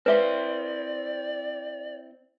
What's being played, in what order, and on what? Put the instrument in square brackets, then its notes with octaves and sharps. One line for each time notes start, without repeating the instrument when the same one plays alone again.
[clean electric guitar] C4 E4 C5 [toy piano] B4 E5 F5 [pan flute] D5